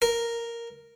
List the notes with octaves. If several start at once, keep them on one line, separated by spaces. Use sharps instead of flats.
A#4